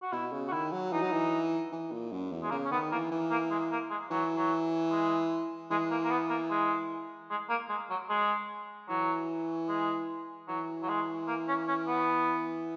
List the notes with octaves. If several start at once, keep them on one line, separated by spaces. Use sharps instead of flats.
F#4
B2 E4
C#3
F#4
D#3 E4
F#3
E3 D#4
F#3
E3
E3
A#2
F#2
E2
G#3
C#3 A#3
C#4
D#3 B3
E3 A#3
E3
A#3
G#3
A#3
G#3
E3 F#3
F#3
G#3
E3 G#3
A#3
A#3
B3
A#3
G#3
G#3
A#3
G#3
F#3
G#3
E3 F#3
G#3
E3 F#3
F#3
G#3
A#3
C#4
C#4
B3